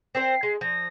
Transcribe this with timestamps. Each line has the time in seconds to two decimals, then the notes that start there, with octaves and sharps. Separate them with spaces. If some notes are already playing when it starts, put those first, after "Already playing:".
0.15 C4 A#4 C5 C7
0.43 G#3
0.61 F3 A#6